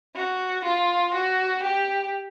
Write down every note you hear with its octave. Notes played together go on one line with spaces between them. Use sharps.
F#4
F4
F#4
G4